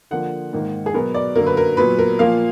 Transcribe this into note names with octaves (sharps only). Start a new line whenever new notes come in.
D3 F3 A#3 F#5
G#2 D#3 A#3
G#4
B2 F#3 B3 A#4
D5
F#2 D3 F#3 A#3 A#4
B4
A#4
A#2 F#3 B3 B4
A#4
A#2 F3 A#3 F5